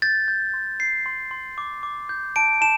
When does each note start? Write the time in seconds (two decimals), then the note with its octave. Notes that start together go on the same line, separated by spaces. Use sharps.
0.02 G6 A6
0.28 G6
0.54 C6
0.80 G6 C7
1.06 C6
1.31 C6
1.58 D6
1.83 D6
2.09 G6
2.36 A5 D7
2.61 A5 E7